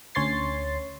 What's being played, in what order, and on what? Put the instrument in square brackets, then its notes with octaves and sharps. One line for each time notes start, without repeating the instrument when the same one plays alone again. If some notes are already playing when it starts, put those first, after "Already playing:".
[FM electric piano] D2 C#4 C#5 C6 A6 C7